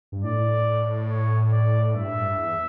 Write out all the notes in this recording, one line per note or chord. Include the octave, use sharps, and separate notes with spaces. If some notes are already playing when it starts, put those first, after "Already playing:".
G2
A2 D5
C#5
D5
G2 E5
A2
G2
E2